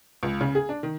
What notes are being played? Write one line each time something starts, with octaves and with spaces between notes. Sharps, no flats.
C#2
C#3
G#4
D4
D#3